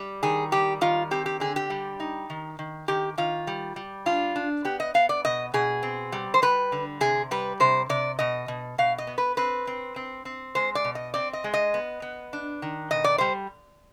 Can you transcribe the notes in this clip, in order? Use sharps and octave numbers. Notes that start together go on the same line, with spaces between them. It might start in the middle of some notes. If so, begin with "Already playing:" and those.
Already playing: G3
D#3 G#4
G3 G4
D#3 F4
C4 G4
G4
D3 G#4
G4
G3
D#4
D#3
D#3
D#3 G4
D#3 F4
G3
G3
D4 F4
D4
B3 G4
D#5
B3 F5
D5
B2 D#5
B2 G#4
C4
G3
C5
G3 B4
D3
C3 G#4
G3 B4
C3 C5
C3 D5
B2 D#5
B2
B2 F5
D#5
B3
B4
C4 B4
C4
C4
C4
G#3 C5
D5
B2
D#5
C4 D5
D#5
G#3
D#5
B3
B3
D4
D#3
B2 D#5
D5
G3 C5